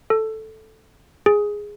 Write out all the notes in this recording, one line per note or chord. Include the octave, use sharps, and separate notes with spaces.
A4
G#4